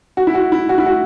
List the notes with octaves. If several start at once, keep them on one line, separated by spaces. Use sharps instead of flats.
F#4
E4
F#4
E4
F#4
E4
F#4